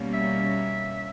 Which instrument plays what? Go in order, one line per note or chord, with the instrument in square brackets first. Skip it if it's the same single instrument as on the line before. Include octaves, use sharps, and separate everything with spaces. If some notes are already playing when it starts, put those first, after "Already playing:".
Already playing: [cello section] B2 G3 A#3 C#4
[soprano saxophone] E5